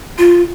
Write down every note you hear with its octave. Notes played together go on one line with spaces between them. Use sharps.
F4